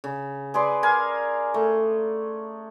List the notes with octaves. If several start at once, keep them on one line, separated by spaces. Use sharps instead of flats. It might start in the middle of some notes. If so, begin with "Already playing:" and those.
C#3
G#4 B4 D5 C6
A#4 F5 G#5
A3